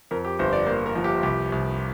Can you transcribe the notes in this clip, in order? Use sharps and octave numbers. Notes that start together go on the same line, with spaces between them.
F2 A#4
G4
G1 C5
D5
A#3 C5
A#4
F3
G4
C2 G4
C2